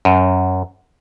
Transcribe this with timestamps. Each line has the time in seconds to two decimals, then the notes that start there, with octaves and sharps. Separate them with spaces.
0.05 F#2